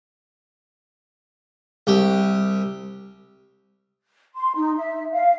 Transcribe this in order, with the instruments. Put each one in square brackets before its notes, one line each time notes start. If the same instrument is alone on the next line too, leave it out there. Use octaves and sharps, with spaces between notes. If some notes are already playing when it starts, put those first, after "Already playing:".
[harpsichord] C2 G4
[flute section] C6
D#4
E5
F5